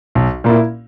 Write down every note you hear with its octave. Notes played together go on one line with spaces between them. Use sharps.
B1
A#2 A#3 E4